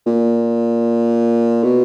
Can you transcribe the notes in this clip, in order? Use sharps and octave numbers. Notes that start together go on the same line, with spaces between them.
A#2
B2